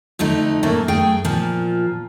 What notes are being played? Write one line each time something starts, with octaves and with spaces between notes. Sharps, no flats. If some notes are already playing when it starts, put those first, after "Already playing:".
F2 D3 A3 D#4
F#2 A2 F#3 A3 A#3
F#2 A3 G#4 G5
A#2 F3